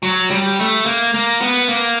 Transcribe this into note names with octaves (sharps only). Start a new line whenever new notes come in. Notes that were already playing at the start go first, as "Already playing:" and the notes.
F#3
G3
A3
A#3
A#3
B3
A#3